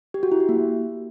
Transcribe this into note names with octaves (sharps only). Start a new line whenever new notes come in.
G4
F#4
E4
G4
A#3